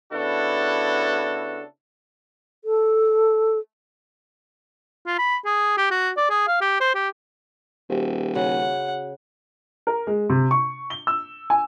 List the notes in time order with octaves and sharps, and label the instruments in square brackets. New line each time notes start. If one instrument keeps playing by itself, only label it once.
[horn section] C#3 B3 D4 E4 F#4 A4
[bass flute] A4
[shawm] F4
B5
G#4
G4
F#4
D5
G#4
F5
G4
C5
G4
[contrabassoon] D#1 [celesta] F#4 G4 C5
[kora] C#3 [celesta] F#4 [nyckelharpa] F#5
[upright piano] A#4
G#3
C3
C#6
G7
E6
G#5